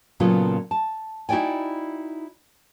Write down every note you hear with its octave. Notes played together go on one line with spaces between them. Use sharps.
A#2 C#3 F#3 B3 F4 A4
A5
D#4 E4 F#4 D5 G5 G#5